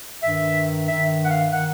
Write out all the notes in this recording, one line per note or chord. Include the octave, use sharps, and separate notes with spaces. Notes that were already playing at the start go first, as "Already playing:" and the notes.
G2 D#3 E5
G2 D#3 E5
F#5
F5
D#3 F#5